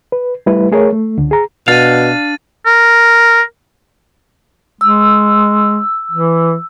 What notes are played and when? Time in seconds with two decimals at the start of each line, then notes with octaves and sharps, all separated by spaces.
0.12 B4
0.46 G3 A3 E4 B4
0.71 A3 G#4 A#4 C#5
0.93 A3
1.18 C#2 D3
1.31 G#4 A#5
1.68 B2 D4 F5 A6 D#7
2.66 A#4
4.81 G#3 E6
6.12 E3